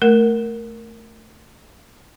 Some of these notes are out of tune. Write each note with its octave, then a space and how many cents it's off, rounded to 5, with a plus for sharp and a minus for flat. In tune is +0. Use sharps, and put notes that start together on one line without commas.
A3 +0 A#4 +0